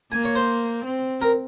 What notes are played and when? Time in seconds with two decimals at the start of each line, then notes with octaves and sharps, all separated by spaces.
0.12 A#3 G#5
0.24 C#5
0.35 C5
0.85 C4
1.22 A#4